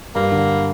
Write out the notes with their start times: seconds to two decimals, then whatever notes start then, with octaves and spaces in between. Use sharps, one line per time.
0.15 G2 A#3
0.32 D3